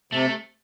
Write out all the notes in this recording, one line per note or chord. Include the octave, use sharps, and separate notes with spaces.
C3 A3